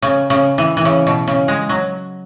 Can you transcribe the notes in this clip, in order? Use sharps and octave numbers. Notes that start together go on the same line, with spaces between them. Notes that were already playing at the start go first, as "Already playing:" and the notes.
C#3
C#3
E3
E3
C#3
B2
C#3
G#3
F#3